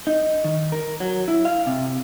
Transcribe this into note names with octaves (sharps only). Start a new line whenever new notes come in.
D#4
D#3
A#4
F#3
E4
F5
C3